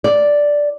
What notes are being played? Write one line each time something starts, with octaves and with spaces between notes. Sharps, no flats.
D5